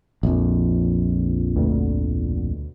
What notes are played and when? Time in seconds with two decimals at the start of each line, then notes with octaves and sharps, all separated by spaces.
0.23 A#1 F2
1.56 D2 B2